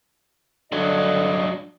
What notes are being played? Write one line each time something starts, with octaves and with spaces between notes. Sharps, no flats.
G2 D3 F#3 D4 D#5